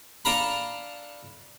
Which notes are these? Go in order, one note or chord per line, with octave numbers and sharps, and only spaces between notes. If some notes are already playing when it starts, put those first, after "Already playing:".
D4 A4 F5 A#5 B5